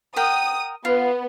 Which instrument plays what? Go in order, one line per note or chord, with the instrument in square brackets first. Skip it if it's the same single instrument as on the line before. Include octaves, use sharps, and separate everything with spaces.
[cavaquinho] A#4 F#5 G5 [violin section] D#6
[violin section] B3 [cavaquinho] F4